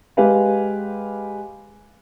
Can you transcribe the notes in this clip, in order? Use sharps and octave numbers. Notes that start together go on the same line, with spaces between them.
G#3 G4 B4 F5 G#5